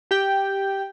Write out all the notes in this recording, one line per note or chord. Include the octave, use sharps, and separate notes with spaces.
G4 G5